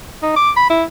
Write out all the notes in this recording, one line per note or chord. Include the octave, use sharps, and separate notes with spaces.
D#4
D6
B5
E4